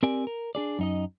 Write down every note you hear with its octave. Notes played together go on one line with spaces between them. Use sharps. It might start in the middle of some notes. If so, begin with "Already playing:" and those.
C4 G4 A#4 D5 G#5
A#4
D4 G#4 D5
F#2 D#4 D#5